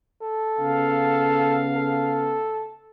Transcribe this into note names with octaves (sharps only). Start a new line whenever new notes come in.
A4
C#3 B3 F5
A4